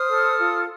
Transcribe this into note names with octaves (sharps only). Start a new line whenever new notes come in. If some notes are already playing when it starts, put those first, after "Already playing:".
Already playing: C5 D#6 F6
A4
F4